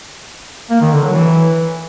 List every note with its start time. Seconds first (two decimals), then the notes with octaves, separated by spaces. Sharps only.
0.70 A#3
0.81 D#3
0.92 D3
1.02 F#3
1.13 E3